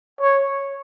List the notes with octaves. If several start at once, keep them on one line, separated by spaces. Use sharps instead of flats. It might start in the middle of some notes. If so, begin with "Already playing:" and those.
C#5